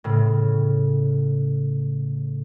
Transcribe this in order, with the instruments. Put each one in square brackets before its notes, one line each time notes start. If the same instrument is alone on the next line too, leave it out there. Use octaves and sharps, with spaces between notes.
[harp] A2 C#3